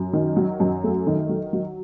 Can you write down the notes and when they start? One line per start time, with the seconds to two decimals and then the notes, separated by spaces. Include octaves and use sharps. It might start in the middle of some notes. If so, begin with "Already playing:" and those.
Already playing: F#2
0.13 D#3
0.37 F#3
0.60 F#2
0.83 A3
1.07 D#3
1.29 F#3
1.53 F#3